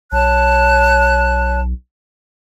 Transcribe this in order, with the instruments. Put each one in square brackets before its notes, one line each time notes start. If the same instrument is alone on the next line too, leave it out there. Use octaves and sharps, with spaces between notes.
[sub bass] B1 [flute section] C#5 A5 F#6